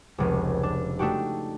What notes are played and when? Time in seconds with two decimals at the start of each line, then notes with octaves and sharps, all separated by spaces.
0.18 F1 C#2
0.63 D4
0.99 A3 D4 D#4 F#4 G4